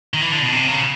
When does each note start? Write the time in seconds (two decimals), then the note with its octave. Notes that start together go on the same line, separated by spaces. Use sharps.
0.14 D#3
0.22 E3
0.32 D3
0.41 B2
0.52 C3
0.68 C#3